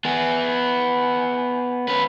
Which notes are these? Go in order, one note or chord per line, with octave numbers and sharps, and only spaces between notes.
B3 G#4
C#4 B4